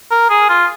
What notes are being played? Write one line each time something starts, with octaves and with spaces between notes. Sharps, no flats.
A#4
G#4
F4